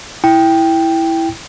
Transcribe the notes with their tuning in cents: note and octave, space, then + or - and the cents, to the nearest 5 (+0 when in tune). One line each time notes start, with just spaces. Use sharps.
E4 +0 G5 +0